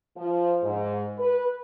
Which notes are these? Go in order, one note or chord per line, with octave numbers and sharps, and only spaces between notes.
F3
G#2
B4